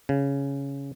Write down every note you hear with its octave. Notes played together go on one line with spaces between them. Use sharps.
C#3